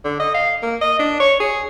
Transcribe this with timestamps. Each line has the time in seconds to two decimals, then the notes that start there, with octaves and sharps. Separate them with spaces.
0.04 D3
0.20 D#5
0.34 F5
0.63 A#3
0.81 D#5
0.99 D4
1.20 C#5
1.40 G#4